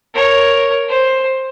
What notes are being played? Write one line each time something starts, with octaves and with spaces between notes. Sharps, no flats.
A#4 C#5
C5